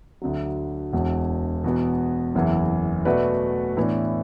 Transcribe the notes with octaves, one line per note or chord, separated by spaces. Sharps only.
D2 D3 F#3
E1 E2 B2
E2 B2 B3
F#1 E2 E3
B2 A3 F#4 B4 D5
A2 E3 B3 D4